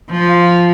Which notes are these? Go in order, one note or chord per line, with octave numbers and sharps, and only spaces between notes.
F3 F4
F5
F4